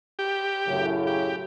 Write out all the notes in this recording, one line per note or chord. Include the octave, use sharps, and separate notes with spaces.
G4
F#2 A2 C#3
G4